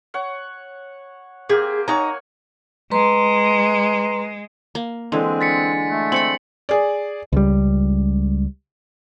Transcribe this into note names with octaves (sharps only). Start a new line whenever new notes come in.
C#5 F#5
A#3 C4 G4 G#4
D#4 C#5 F#5 G#5 A#5
G#3 B4 A#5 C6
A#3
D3 E3 G#3 C4 G#4
A6 B6 C#7
A3
C4 B5 C#7 F#7
G#4 D5
C#2 G3